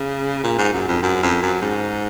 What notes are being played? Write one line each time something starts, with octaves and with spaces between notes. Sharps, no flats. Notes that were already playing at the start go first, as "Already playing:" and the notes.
Already playing: C#3
A#2
G#2
F#2
F2
F#2
F2
F#2
G#2